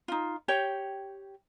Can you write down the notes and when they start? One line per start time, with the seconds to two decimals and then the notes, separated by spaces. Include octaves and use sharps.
0.08 D#4 F4
0.48 G4 C#5 G5